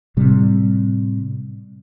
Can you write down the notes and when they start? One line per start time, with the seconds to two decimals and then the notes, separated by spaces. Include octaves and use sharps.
0.17 A2 C3 G3